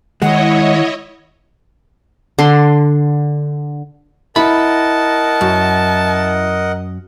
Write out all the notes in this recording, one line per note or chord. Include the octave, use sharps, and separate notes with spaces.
D#3 G#3 E4 C#5 D#5 F#5
D3 C6
E4 A#4 D#5 F#5 A5 B5
F#2